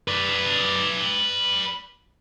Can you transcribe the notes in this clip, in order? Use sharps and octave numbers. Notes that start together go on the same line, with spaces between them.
B4 D5